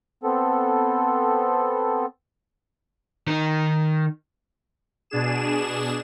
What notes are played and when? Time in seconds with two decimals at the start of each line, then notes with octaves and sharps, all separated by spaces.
0.24 B3 C4 A4
3.28 D#3 D#4
5.10 B2 D4 G#4 E7